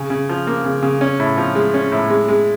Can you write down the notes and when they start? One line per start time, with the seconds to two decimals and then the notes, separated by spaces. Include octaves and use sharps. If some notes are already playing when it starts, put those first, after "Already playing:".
Already playing: C#3
0.10 C#3
0.29 F3
0.47 A#3
0.64 C#3
0.82 C#3
1.01 C#4
1.20 A2
1.37 F3
1.55 G#3
1.74 C#4
1.92 A2
2.10 G#3
2.28 G#3